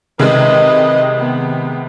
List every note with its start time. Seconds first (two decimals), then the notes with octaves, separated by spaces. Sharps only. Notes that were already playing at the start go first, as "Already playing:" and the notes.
0.19 C3 D#3 G#3 B4 D#5
1.18 B3